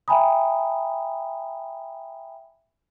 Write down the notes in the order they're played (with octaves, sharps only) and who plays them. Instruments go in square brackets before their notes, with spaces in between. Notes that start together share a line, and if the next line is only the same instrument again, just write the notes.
[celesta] E5 G5 G#5 A#5 B5 D#6